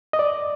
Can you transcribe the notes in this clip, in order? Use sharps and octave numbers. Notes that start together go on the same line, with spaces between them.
D#5
D5